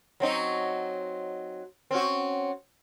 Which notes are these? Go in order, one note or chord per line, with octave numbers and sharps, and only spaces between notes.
F#3 C4 D#4
C4 C#4 F#4